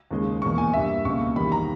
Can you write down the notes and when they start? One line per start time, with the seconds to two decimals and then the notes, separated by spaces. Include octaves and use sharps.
0.11 D#2 C#3 G#3
0.42 E2 B2 A#3 C#6
0.58 G#5
0.73 G2 G3 A#3 E5
1.05 C#2 B2 A#3 C#6
1.36 E2 D#3 G3 B5
1.52 A#5